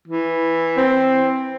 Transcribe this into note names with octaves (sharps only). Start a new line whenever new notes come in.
E3
C4